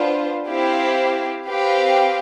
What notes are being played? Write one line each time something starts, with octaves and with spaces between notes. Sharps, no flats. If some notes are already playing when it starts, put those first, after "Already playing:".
Already playing: B3 D4 F4 C5
C4 E4 G4 C5 F5
C4 G4 B4 F5